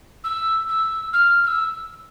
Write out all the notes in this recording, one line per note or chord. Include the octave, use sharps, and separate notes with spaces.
E6
E6
F6
F6
E6